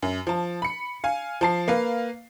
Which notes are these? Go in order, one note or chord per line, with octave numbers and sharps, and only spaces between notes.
F#2
F3 A5
B5 C#7
F5 G#5
F3 A5 C7
A#3 B4 F5